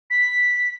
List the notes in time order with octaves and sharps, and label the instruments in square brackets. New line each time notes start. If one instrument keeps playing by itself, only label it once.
[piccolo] B6